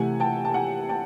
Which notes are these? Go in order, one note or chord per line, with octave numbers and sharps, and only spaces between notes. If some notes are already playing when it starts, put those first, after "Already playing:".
Already playing: C3 E3 A3 F#5 G#5
G5 A5
A5
F#5 G#5
G5 A5